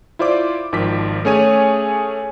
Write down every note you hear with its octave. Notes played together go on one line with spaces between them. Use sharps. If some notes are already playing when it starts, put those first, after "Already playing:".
E4 F4 C5 D5 D6
G#1 D#3 F3 D6 B6
A3 C#4 G#4 C#5 G#5 D#7